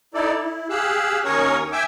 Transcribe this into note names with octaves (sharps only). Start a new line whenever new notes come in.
D#4 E4 A4 D5
E4
G4 G#4 F5 E6 F#6
D#2 C#4 A#4 C#5 C#6 D#6
E5 G5 G#5 D6 E6